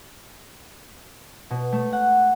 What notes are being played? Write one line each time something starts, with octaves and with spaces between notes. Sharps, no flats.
B2
A3
F#5